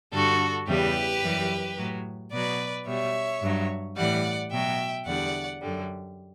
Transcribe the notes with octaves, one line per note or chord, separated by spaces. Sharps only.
G2 D3 G3 F#4 A4
E2 C#3 E3 G3 G4 B4
F#2 E3 G3
A2 F#3
B2 F#3 B4 D5
B2 G3 C#5 E5
G2 F#3
A2 E3 G3 D5 F#5
B2 F#3 E5 G5
E2 D3 G3 D5 F#5
F#2 D3 G3